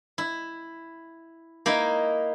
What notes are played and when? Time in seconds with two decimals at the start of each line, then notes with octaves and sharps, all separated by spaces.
0.18 E4
1.66 A#3 D#4 E4